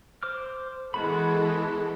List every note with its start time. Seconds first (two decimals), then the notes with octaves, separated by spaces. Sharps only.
0.23 C5 D6 F6
0.94 E3 G#3 B3 F#4 A4 B5